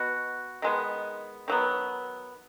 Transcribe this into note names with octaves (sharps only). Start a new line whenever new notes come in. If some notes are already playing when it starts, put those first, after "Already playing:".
Already playing: B2 B3 F#4
D#3 G#3 B3
D#3 F#3 B3